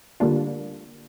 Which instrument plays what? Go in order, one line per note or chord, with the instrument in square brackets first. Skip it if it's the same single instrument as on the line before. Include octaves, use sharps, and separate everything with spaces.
[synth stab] D3 G3 A#3 D4 F4